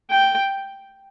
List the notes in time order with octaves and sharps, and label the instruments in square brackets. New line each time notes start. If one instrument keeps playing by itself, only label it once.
[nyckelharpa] G5